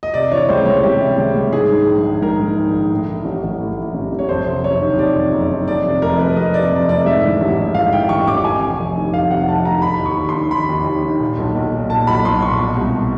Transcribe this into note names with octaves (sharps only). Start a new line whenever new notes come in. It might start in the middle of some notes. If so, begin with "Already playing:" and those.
D#5
C3 D5
E3 C#5
C#2 C5
C#2 C#5
C3 G4
E3
C#2
C#2
G#2 G#4
D#3
A#1
A#1
G#2 A#4
D#3
A#1
A#1
A2
E3
A1
A1
A2
E3
A1
A1
C#5
F2 C5
C3
F#1 C#5
D#3
F2 D5
C3
F#1
D#3
F2 D5
C3
F1 A#4
F1 B4
F2 D#5
C3 D5
F1
F1 D5
G#2 E5
E3
A1
A1
G#2 F5
E3 G5
A1 C#6
A1 D6
F2 G#5
C3
F1
D#3
F2 F5
C3 F#5
F1 A5
D#3 A#5
D#3 B5
D#2
C#6
D#2
C6
D#3
D#3 B5
D#2
D#2
D#3
A#2
B1
B1
A#2
A#2 A5
B1 B5
B1 C6
A#2 C#6
B2
C2